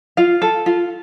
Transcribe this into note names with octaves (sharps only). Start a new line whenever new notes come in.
F4 F5
A4
F4